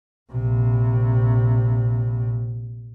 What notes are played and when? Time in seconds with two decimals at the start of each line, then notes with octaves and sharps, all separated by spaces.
0.32 A#1 C3